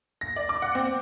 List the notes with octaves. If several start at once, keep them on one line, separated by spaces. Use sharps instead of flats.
A#6
D5
D6
F#5
C4